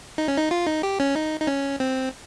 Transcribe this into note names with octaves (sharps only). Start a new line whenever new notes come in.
D#4
C#4
D#4
F4
D#4
G4
C#4
D#4
D#4
C#4
C4